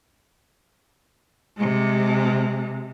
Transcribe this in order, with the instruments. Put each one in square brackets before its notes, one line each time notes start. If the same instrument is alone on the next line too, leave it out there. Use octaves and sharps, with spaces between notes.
[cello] C3 G#3